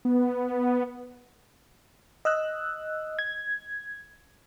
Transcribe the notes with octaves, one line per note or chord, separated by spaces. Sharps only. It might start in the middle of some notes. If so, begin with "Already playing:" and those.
B3
D#5 E6 F#6
G#6